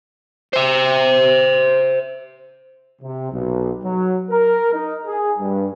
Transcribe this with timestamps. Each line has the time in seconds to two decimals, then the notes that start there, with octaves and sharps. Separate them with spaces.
0.53 C5 E5
3.02 C3
3.32 B1
3.83 F#3
4.31 A#4
4.73 D#4
5.06 G#4
5.39 G2